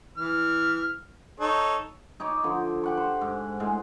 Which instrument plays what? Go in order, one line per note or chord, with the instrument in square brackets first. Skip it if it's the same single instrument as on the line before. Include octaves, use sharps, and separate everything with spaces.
[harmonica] E3 F6
D#4 A4 C#5
[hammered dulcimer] D#4 C#5 D#5 D6
D3 F3 C6
G4 F#5 C#6
C5
G#2
A2 G#3